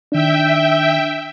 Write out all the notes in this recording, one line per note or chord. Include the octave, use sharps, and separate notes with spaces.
D#3 D4 E5 G5